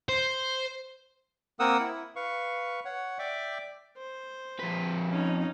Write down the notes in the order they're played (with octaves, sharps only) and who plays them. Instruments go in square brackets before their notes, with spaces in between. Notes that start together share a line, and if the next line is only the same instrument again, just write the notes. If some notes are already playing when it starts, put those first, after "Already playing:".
[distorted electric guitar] C5
[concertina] A#3 C4 A#4 F#5 D#6 E6
E4
B4 F5 C#6
C#5 F#5
D5 E5 G5 D6
[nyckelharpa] C5
[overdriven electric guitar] F2 B4
[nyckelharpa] C#4 D#4